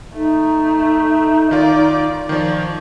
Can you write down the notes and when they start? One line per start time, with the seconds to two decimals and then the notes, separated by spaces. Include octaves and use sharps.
0.14 A3 D#4
1.51 D#3 F4 D5 D6
2.29 D#3 F3 C#5 D5